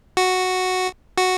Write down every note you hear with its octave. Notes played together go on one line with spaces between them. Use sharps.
F#4
F#4